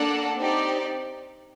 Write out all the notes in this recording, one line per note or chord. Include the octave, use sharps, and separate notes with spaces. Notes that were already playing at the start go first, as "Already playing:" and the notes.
Already playing: A#3 D4 A4 D5 F#5
C4 D#4 G4 D5